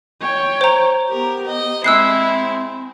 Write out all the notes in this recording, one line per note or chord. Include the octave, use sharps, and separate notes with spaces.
C#5 G5
C5 A#5
B3 G4 A#4
D#5
G#3 C4 E4 E6 F#6 C7